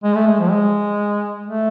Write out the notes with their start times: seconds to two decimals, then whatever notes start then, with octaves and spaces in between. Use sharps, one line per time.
0.04 G#3
0.15 A3
0.27 G#3
0.40 F3
0.51 G#3
1.47 A3